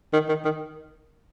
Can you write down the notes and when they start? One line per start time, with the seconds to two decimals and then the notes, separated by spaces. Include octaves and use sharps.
0.13 D#3
0.29 D#3
0.45 D#3